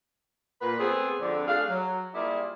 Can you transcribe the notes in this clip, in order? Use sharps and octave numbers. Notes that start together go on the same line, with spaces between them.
A#2 B4
A3 B3 C4 G#4
F2 D3
A3 D4 G#4 F5
F#3
G3 A#3 E4 F4 G#4 D5